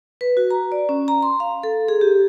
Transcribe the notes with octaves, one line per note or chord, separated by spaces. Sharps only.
B4
F#4
A#5
D5
C#4
A#5
C6
F5
A4
G#4
G4